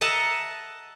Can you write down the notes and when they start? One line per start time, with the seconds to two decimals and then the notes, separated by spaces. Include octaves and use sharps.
0.01 D#5 E5 F#5 A5 A#5